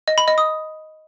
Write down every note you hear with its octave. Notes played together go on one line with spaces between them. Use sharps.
D#5
B5
D#5
D#6